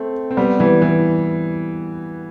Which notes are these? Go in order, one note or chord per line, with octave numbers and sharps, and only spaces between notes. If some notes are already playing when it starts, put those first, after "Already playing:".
Already playing: A3 C4
C4
G3 B3
E3 G3
E3